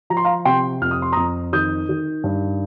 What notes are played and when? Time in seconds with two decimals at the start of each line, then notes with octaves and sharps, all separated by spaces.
0.10 F3 A#5
0.17 C6
0.25 F5 A#5
0.45 C3 G5 C6
0.81 F2 F6
0.91 D#6
1.02 C6
1.12 F2 A#5 D#6
1.53 D#3 D#6 G6
1.89 D#3
2.24 G2